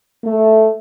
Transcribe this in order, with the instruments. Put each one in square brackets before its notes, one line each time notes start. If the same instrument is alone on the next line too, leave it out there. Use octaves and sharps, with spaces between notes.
[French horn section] A3